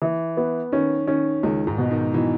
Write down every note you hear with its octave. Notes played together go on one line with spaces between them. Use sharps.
E3
B3
D#3 C#4
D#3 C#4
C#2 D#3
G#2
B2
D#3
B2 E3